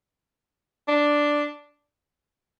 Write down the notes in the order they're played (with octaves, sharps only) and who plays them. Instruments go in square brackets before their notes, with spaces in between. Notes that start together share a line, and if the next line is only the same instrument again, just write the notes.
[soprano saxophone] D4